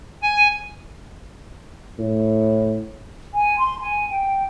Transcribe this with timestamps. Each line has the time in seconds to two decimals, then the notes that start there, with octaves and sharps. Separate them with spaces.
0.22 G#5
1.99 A2
3.33 G#5
3.57 C6
3.80 G#5
4.09 G5